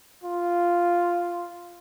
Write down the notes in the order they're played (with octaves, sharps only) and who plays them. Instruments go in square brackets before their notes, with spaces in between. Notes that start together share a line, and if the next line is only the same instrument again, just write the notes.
[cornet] F4